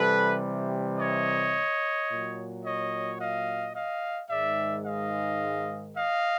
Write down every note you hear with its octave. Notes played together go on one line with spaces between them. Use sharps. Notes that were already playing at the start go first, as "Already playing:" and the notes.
Already playing: C3 E3 G3 A4 B4
C#5 D#5
A#2 F#3
C#5 D#5
D#5 F5
D#5 F5
G#2 D#3 G#3 D5 E5
D#5 F5
D#5 F5